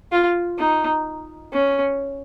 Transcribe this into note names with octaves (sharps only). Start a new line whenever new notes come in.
F4
D#4
C#4